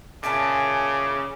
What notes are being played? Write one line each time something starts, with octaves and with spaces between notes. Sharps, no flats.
A#2 C#3 E4 G#5 A5 D6